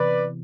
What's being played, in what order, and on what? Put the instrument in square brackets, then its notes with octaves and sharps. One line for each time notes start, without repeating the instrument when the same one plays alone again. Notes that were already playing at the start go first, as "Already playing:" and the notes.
Already playing: [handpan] C3 E3 B3 [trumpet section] B4 D5